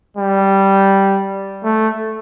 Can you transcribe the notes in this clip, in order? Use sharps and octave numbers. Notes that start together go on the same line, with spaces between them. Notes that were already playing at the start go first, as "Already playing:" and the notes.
G3
A3